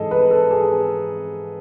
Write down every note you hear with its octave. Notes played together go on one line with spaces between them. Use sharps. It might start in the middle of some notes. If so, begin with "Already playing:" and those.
Already playing: G#2 E3 G#4 A4 D#5
B4
A4
G#4